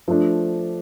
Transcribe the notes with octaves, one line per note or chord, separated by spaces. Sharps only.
F3 A3 D4